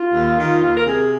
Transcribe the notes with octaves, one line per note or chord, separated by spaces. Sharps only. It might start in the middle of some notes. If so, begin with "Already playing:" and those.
Already playing: F4
D#2
D#3
D#2
A#4
C3 G#4